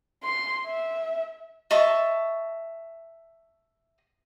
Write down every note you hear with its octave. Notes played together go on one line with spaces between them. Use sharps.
C6
E5
D#5 E5 A5 C#6